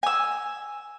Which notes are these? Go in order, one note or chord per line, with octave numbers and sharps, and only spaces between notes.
G#5 E6